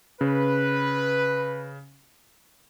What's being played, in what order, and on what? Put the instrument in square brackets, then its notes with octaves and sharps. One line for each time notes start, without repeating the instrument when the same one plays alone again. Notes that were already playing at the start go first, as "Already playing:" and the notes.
[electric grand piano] C#3 [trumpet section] B4